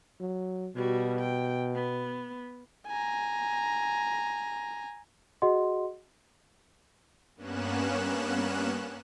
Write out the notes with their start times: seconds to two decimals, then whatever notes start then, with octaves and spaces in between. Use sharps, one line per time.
0.20 F#3
0.76 B2 G3 F#4
1.20 G5
1.75 B3
2.88 G#5 A#5
5.42 F#4 G#4 D#5 F#5 C6
7.36 G2 A#3 B3 C#4 F#6 E7